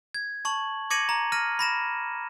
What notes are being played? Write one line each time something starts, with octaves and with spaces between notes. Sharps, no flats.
G#6
A5 C#6 F#7
D6 G#6 A#6 C#7 D#7 F#7
A#5
F6 A#6 D#7
B5 A#6 E7